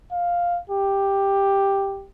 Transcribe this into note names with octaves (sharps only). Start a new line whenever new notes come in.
F5
G4